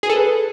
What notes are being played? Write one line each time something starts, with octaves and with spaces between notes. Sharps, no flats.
G#4
A4
B4